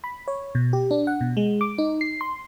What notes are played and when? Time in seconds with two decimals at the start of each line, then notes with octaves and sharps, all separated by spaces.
0.04 B5
0.28 C#5
0.55 B2
0.73 G4
0.91 D4
1.07 F#5
1.21 B2
1.37 G#3
1.61 D6
1.78 D#4
2.01 C7
2.21 C6